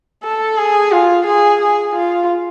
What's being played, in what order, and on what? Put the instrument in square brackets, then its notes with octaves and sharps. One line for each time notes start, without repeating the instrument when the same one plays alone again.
[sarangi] A4
G#4
F4
G#4
G#4
F4